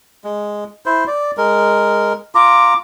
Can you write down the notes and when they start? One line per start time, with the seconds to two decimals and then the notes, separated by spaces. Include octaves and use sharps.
0.24 G#3
0.86 E4 C5
1.07 D5
1.38 G#3 A#4
2.35 F4 A#5 D6